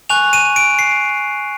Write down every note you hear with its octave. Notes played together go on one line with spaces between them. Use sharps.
G#5 C#6 F#6 F7
D#7
D7
C7